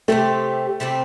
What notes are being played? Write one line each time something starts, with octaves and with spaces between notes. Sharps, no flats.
C3 G3 A3 C4 G4
C3 G3 C4 G4